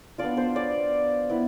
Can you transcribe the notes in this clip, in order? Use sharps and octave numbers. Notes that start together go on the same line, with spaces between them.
B3 D4 F4 D5
C5
D5
B3 E4